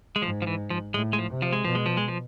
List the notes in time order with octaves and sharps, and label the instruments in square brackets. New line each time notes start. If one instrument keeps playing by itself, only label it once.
[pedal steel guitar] G#3
[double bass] G#2 [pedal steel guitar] F3
[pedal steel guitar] F3
E3
F3
[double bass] A2 [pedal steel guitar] G#3
[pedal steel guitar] G#3
F3
[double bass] C3
[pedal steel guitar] F3
G#3
[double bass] B2 [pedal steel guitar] F3
[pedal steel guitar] G#3
F3
G#3
F3